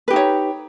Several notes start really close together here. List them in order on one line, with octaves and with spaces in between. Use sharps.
B4 G4 D#4 C#5